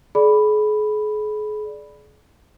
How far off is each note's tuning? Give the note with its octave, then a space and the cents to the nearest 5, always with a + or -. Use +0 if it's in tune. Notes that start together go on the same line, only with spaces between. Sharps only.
G#4 +40 D5 +0 B5 +0